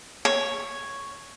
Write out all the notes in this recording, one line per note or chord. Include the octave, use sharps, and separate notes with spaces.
C#5